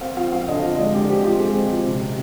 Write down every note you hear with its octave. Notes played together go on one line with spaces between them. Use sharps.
C4 F5
F3 F5
C4 F5
D3 D#5
F3
G#3 D5
D3 G4
C4 G4
G#3 F4
G#3 G#4
C4
F3
C3
C3